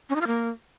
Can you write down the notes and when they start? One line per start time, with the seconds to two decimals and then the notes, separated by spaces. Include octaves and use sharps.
0.10 C#4
0.15 D#4
0.21 F4
0.27 A#3